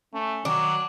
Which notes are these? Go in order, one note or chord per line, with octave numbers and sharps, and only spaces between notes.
A3 C#4
D#3 F#3 D4